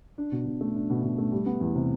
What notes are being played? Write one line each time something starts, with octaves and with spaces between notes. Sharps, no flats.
D4
B2
B2
A3
D4
B2
B2
A3
G3
B3
E2
C3